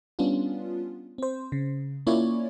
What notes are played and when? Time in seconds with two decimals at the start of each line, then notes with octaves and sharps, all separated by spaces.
0.19 G3 B3 C#4 D4 F4
1.18 C4 C5
1.52 C#3
2.07 A#3 C#4 E4 F4 C#5 D5